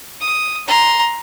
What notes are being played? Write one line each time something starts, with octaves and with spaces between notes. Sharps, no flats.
D#6
A#5 C6